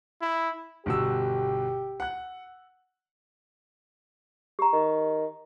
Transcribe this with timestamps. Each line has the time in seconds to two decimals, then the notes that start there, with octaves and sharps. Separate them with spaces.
0.21 E4
0.86 G1 B2 G4 E6
2.00 F#5 F#6
4.59 G4 A#5
4.73 D#3